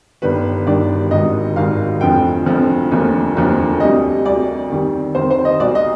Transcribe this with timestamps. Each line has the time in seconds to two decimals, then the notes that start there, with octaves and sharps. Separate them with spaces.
0.22 G1 G2 D#3 G3 B4
0.66 G1 G2 D#3 G3 D5
1.11 G#1 G#2 D#3 G3 D#5
1.56 G#1 G#2 D#3 G3 F5
2.01 F1 F2 D3 F3 G5
2.46 F1 F2 D3 F3
2.91 F1 D#2 D3 F3
3.35 F1 D#2 D3 F3
3.80 D2 C3 G3 D#5
4.25 D2 C3 G3 D5
4.70 F2 C3 D#3 G3
5.15 F2 C3 D#3 G3 C5
5.30 C5
5.45 D#5
5.60 B1 B2 G3 D5
5.75 D#5